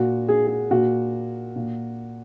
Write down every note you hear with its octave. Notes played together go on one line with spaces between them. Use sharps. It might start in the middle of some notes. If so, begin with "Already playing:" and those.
Already playing: A#2 F#4
G#4
G#4
A#2 F#4
A#2